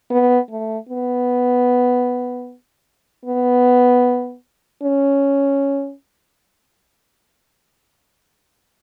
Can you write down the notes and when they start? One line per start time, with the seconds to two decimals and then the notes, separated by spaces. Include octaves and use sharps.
0.10 B3
0.50 A3
0.89 B3
3.25 B3
4.82 C#4